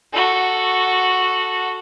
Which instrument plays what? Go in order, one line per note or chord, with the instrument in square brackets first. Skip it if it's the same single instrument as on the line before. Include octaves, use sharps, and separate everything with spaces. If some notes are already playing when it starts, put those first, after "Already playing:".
[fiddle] F#4 A4